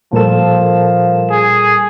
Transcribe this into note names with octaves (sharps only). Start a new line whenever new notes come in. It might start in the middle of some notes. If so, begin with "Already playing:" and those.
A#2 F3 G3 A4 A#4 E7
G#4